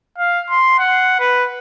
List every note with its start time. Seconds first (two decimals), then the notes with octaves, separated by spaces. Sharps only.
0.18 F5
0.50 C6
0.79 F#5
1.20 B4